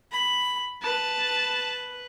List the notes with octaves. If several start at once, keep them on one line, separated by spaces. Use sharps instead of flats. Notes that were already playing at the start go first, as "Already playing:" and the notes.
B5
B4 A5